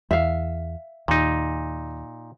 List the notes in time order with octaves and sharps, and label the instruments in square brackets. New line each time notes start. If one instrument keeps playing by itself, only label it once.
[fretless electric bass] E2 [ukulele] E5 F5
[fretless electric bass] D#2 [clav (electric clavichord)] A#2 D#4